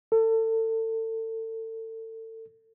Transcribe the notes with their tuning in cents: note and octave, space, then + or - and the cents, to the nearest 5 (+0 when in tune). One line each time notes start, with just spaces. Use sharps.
A4 +30